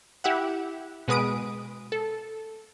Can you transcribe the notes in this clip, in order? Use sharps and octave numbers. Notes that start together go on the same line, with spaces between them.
E4 G4 E5 F#5
B2 G#3 B4 D#6 D7
A4